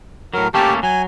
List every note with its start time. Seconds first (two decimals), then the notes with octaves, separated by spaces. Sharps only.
0.34 A2 F#3 A#4
0.54 A3 A#3 C#4 G4 A5
0.83 F#3 G#5